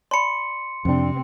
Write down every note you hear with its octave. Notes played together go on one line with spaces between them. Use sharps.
D5 A5 B5 C6 C#7
F2 C3 C4 D4